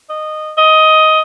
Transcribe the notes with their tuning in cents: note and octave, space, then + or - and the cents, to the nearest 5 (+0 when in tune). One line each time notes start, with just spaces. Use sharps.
D#5 -15
D#5 +15